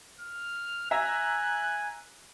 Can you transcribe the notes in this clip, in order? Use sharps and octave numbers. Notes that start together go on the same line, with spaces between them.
F6
E5 G#5 A#5 F#6